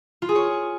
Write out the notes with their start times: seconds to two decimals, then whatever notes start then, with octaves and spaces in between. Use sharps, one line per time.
0.22 F4
0.29 G#4
0.35 C#5